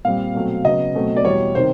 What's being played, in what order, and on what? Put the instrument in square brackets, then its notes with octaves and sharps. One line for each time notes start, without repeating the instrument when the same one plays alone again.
[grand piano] A#2 G3 C4 F5
B2 F#3 A3 C4
C#3 F#3 B3 D#5
B2 F#3 A3 C4
D5
E2 B2 G3 C#5
C3 D#3 C5